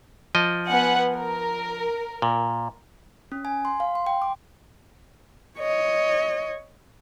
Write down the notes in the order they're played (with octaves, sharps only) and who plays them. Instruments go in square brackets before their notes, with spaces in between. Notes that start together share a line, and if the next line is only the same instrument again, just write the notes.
[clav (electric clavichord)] F3 D#5
[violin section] B3 F#5 G#5
A#4
[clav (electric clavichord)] A#2
[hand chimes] C#4
G#5
C6
F5
C6
G5
D6
[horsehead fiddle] C#5 D#5